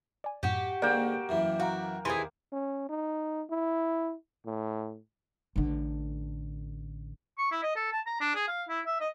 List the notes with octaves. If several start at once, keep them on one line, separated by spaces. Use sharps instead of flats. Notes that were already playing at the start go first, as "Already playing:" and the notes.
D5 G#5
F#2 A2 F#4 G4
G#2 D3 A#3 D5 G5 G#5
F#2 E3 E4
F#4 F5 A#5
D#2 E3 C4 G#4 C6
C#4
D#4
E4
A2
A1 D3
C#6
E4
D#5
A4
A5
A#5
D4
G#4
F5
E4
E5
D#5